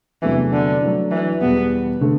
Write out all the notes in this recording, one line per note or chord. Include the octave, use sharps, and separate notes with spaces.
E2 C3 E3 F#3 A3 D4
D3
F#3 A3 D4
E3
E2 B2 G3 B3
D3 A3